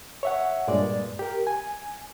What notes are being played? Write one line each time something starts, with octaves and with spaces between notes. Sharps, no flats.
C#5 E5 F#5
G2 A#2 G#3 D5
G4 A#4
G#5